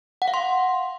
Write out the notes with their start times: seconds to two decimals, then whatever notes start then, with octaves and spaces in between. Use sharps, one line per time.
0.22 F#5
0.28 F5
0.34 C6